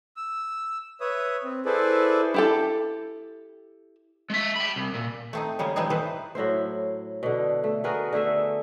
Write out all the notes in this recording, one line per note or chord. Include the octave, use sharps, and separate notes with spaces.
E6
B4 C#5 E5 D#6
C4
E4 G#4 A4 B4 C5 D5
E4 G4 A4
G#3 E5
G5 B5
C2
A#2
A3 C4 D#4
C#3 G3 G#3 A#3
E3 F3 G3 G#3 C4 D#4
E3 A3 C4 B4 C5
A2 F#3 E4 C5
B2 D3
A3
B3 F#4 G#4 A#4
D3 A3 G#4 E5